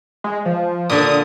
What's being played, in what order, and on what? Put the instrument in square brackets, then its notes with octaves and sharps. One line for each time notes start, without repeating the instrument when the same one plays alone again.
[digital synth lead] G#3
F3
[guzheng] A#2 D3 [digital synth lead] D#6